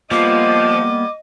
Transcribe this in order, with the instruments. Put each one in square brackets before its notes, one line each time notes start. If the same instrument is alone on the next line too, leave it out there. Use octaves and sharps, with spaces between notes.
[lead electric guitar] F3 [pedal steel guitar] G3 A#3 B3 [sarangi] D#5 [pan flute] D6